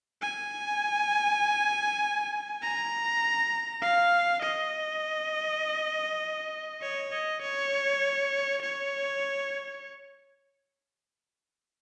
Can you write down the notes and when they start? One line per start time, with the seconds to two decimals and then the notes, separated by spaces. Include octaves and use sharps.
0.22 G#5
2.62 A#5
3.82 F5
4.42 D#5
6.82 C#5
7.12 D#5
7.42 C#5
8.62 C#5